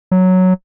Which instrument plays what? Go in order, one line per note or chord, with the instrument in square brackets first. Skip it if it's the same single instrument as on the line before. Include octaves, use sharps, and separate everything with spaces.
[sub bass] F#3